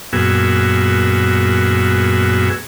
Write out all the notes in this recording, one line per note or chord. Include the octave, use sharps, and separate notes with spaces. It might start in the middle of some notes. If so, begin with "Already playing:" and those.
F#2 A#2 B3 F#4 G#4 E6